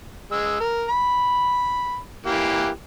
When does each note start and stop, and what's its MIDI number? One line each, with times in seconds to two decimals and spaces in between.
0.32 0.59 56
0.32 0.59 88
0.60 0.86 70
0.88 1.98 83
2.26 2.68 52
2.26 2.68 58
2.26 2.68 67